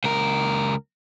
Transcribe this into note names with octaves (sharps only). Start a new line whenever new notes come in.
C#2 A#4